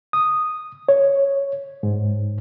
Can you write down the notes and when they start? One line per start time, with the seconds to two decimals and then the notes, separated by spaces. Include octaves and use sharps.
0.13 D#6
0.89 C#5
1.83 G#2